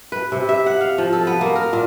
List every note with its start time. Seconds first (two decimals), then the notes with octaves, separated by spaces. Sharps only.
0.12 B4
0.32 C3
0.49 E5
0.66 F#5
0.81 F5
0.98 F3
1.13 A4
1.27 B3
1.41 A#3
1.55 A#4
1.73 A#2